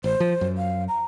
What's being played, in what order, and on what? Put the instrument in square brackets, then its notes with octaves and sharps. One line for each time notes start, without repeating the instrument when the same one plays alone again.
[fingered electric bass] A1 [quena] C5
[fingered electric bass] F3
F#2
[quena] F5
A#5